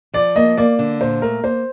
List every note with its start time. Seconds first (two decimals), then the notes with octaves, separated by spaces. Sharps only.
0.14 F3 D5
0.36 A#3 D#5
0.57 A#3 D5
0.79 D3
1.01 A#2 C5
1.22 A3 A#4
1.44 A#3 C5